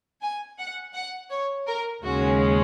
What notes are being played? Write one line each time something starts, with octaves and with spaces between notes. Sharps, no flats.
G#5
F#5
F#5
C#5
A#4
D#2 C#3 G#3 C#4 F#4